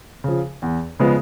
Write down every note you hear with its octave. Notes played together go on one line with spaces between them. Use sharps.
C#3 F3
E2
C#3 F3 G#3 B3